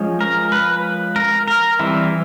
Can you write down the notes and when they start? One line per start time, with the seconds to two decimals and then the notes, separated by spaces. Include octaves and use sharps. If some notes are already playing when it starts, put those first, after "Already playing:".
Already playing: F3 G#3 C#4
0.21 A#4
0.52 B4
1.16 A#4
1.48 A#4
1.79 E3 G3 C4 E4